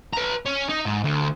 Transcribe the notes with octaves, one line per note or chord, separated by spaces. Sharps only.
B4 A#5
C#4
D#4
G#2
D2